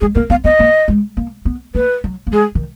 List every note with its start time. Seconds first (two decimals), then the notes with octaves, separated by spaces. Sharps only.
0.01 G#3 G#4
0.15 A#3 A#4
0.30 B3 F5
0.44 B3 D#5
0.59 A#3
0.88 G#3
1.17 A#3
1.45 B3
1.75 A#3 B4
2.04 F#3
2.27 A#3
2.33 G#3 G#4
2.55 D#3